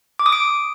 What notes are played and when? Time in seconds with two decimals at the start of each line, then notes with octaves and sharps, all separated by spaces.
0.19 D6
0.26 D#6
0.32 D7